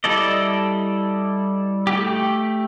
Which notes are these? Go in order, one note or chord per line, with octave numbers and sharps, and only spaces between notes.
G3 E4 A4 D5 D#5
A3 G4